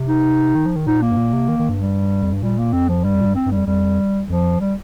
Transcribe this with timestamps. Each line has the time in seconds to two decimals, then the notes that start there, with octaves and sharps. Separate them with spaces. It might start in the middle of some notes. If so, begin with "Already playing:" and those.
Already playing: C3
0.08 D#4
0.55 D#3
0.66 F3
0.76 D#3
0.86 A#2 D#4
1.02 A#3
1.11 G2
1.17 A#2
1.33 C3
1.48 D#3
1.59 D#3
1.69 G2
1.80 G3
2.22 F2
2.32 G2
2.42 A#2 G3
2.58 A#3
2.73 F2 C4
2.89 F3
3.04 G2 G3
3.15 F2
3.21 A#2
3.25 G2
3.36 C4
3.46 G2
3.51 G3
3.57 F2
3.67 F2 G3
4.29 F2 F3
4.60 G3